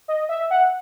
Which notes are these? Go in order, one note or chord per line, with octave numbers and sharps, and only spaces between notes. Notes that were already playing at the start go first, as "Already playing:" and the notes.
D#5
E5
F#5